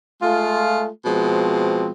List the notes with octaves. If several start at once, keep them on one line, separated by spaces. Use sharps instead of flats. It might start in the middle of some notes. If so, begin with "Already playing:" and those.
G#3 A3 F4
B2 F3 G#3 C4